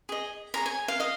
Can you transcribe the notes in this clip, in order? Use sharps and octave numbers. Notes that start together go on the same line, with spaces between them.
G#4 D#5
G#4 C#5 A#5
G#5
F5
D#5 F5